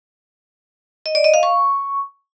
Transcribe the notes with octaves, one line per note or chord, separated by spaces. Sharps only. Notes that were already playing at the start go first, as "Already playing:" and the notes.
D#5
D5
D#5
F5
C#6